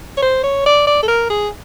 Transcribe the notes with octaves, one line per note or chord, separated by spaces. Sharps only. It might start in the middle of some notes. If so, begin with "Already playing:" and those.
C#5
C5
C#5
D5
D5
A4
A#4
G#4